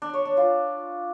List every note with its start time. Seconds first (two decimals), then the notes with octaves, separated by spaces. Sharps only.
0.02 D4
0.14 C#5
0.25 D4
0.37 F4